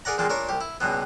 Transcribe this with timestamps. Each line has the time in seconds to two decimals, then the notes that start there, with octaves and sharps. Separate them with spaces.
0.05 G#4 A#4 D5 F#5 A#5
0.18 E2 A#2 G#3 A#3 G5 A5
0.29 A#2 D4 A#4 C#5 A#5
0.49 C2 G4
0.61 E4
0.80 C#2 G2 B2 B3